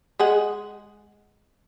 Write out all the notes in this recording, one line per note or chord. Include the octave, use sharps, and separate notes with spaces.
G#3 G#4 F#5